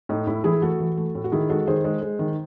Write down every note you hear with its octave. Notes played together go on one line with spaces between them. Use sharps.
A2 D#4
A2 E4
E3 E4 G#4
A3 F#4 A4
E3
A3
A2
F#4
D#3 E4 G#4
G#3 F#4 A4
D#3 G#4 C5
G#3
G#3
D#3